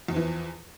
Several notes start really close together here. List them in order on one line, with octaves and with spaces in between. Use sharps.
E2 F3 E3